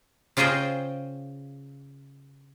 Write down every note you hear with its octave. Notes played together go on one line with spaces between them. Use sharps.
C#3 F4 G#4 C5 D#5 G5